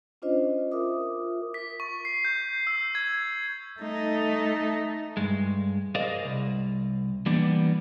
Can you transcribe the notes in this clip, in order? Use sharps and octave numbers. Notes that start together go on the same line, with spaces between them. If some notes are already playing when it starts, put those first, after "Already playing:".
C#4 D4 F4 C5 D#5
F4 A#4 E5 D6 D#6
B6
C#6
C7
G6
E6
G#6
A3 D#4
G2 G#3
G#4 A#4 C5 D5 D#5 F5
C2
E3 G3 A#3 B3 D4